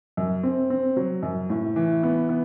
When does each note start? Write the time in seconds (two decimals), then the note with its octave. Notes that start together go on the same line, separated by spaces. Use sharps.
0.17 F#2
0.43 C4
0.70 C4
0.97 F#3
1.23 F#2
1.50 A2
1.76 E3
2.03 B3
2.29 B3